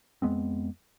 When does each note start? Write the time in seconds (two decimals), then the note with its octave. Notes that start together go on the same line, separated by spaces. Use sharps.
0.22 F2 G#3 B3 C4